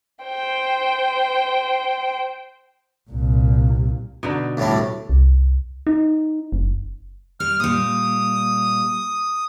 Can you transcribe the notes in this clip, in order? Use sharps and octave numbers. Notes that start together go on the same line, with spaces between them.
C5 G5
C2 A#2
B2 D3 D#4
D2 A2 G3
C2
D#4
F#1
G3 F6
A#2 G3 D#6